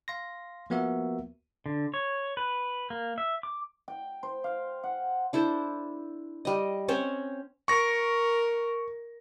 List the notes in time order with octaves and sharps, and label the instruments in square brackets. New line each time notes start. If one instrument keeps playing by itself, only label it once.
[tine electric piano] F5 C6 A#6
F3 A#3 B3 F#4 A#4 E5
[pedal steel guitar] D3
C#5
B4
A#3
E5
D6
[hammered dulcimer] G5
C5
F5
F#5
[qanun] D4 E4 A4 C5
G3 D#5
C4 C#4 C5 C#5
[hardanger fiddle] A#4 [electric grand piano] C#6 A#6